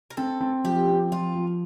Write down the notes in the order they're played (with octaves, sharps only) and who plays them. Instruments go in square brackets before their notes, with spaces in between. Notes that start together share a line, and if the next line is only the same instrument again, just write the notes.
[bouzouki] A#4
[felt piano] C4 [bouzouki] A4
[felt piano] C4
[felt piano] F3 [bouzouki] G4
[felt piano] C4
[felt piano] F3 [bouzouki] F4
[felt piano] F3